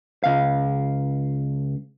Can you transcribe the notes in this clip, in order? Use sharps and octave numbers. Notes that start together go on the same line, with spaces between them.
C#2 F5